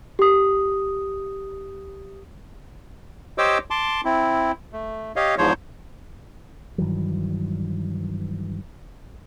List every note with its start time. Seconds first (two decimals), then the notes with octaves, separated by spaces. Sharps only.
0.19 G4 D#6
3.38 G4 C5 C#5 D#5 D6 E6
3.70 A5 C6 D6
4.05 C4 E4
4.73 A3
5.16 G4 C#5 D#5 F5
5.38 E2 G#2 F3 C5 C#5
6.78 G2 D#3 E3 F#3